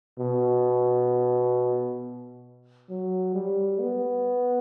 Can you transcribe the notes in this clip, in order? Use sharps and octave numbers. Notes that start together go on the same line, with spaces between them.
B2
F#3
G3
B3